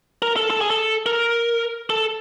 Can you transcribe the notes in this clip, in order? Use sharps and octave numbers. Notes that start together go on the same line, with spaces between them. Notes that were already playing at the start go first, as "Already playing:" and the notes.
A#4
A4
A4
G#4
A4
A#4
A4